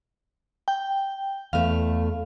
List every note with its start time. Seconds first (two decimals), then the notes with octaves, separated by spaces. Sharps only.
0.68 G5
1.53 E2 A3 F5